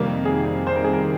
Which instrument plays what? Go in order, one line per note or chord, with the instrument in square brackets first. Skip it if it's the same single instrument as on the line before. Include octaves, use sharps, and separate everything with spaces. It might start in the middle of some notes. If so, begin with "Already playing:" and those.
Already playing: [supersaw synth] F2 C3 D#3 G3 [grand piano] A#3
[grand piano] G#4
C5
A#4
G#4
A#4